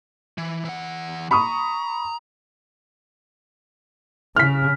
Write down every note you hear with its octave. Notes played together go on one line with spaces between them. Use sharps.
E3
E3 F#5
A#5 B5 C#6 D#6
C#3 F6 B6